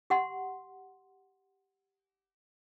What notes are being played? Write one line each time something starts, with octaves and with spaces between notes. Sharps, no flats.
G4 F#5 C6